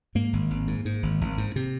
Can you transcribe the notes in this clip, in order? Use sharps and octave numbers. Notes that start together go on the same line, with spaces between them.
G#2 A#3
G#1
G#1
G#2
G#2
G#1
G#1
G#2
C3